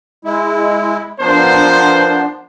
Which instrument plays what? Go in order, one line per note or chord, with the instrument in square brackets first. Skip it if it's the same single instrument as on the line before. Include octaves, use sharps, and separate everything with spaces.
[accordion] G#3 E4
[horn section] F3 A#4 C5 [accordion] B3 D4